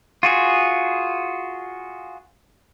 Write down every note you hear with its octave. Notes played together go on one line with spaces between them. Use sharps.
F4 F#4 G#4